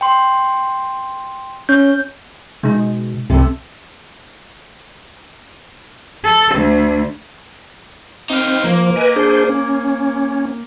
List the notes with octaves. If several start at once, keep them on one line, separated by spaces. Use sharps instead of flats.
G5 C6
C#4 G6
B2 G#3 D#4
C2 C3 G3 A4
A4
D2
C4 D#4 F5
F3 A#3
B4 D#5 G#5
D4 G#4 C5
C#4